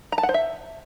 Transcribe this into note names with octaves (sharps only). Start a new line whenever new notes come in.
A#5
A5
F#5
C5
E5